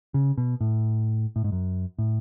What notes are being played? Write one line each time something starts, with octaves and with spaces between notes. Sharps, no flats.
C#3
B2
A2
A2
G#2
F#2
A2